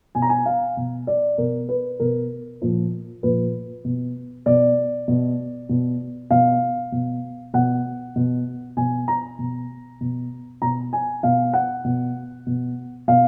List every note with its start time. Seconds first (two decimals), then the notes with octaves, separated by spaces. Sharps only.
0.15 B2 G#5
0.22 A#5
0.29 G#5
0.46 F5
0.77 B2
1.07 D5
1.38 B2 A#4
1.69 B4
2.00 B2 A#4
2.62 A#2 F3
3.23 A#2 F3 B4
3.84 B2
4.46 B2 D5
5.08 B2
5.69 B2
6.30 B2 F5
6.92 B2
7.53 B2 F#5
8.16 B2
8.77 B2 G#5
9.08 A#5
9.38 B2
10.00 B2
10.62 B2 A#5
10.93 G#5
11.23 B2 F5
11.53 F#5
11.84 B2
12.46 B2
13.08 B2 F5